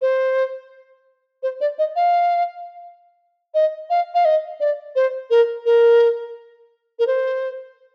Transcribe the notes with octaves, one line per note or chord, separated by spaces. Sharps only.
C5
C5
D5
D#5
F5
D#5
F5
F5
D#5
D5
C5
A#4
A#4
A#4
C5